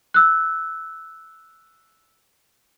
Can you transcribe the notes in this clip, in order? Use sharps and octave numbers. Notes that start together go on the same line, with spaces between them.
E6 F#6